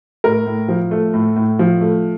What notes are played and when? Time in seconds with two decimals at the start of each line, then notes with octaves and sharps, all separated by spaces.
0.24 A2 A#4
0.46 A2
0.68 F3
0.91 A3
1.14 A2
1.36 A2
1.59 F3
1.81 A3